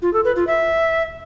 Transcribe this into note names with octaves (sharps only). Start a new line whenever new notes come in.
F4
A4
B4
F4
E5